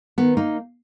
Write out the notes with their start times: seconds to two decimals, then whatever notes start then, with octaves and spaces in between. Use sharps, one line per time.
0.18 D#3 B3
0.37 A#3 D#4